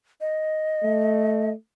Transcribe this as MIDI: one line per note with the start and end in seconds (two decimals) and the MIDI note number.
0.21 1.51 75
0.84 1.54 57